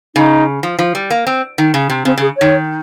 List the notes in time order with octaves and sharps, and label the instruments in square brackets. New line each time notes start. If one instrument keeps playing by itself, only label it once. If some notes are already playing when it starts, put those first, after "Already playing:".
[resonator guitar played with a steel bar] C#3 [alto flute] D#4
[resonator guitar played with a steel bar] F3
F3
G3
A#3
C4
D#3
C#3
C3
[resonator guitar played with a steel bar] C#3 [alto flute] C4
[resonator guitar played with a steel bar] C#3 [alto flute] G#4
[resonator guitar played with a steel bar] D#3 [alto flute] C#5